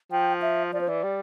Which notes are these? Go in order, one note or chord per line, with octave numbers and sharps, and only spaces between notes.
F3 G5
E5
F3 D5
C5
E3 D5
G3